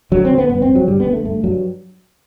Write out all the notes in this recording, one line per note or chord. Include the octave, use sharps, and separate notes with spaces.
D3 F#3
C4
D3
B3
G2 B3
C4
G2
F#3
D3 G3
B3
D3
A3
G2 A3
G2 F#3